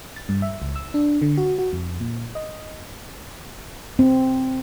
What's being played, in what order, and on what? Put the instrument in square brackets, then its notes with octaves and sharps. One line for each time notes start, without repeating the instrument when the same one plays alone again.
[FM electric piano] A6
G2
E5
C#2
E6
D4
D3
F#4
F#4
F2
A#2
D#5
[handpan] C4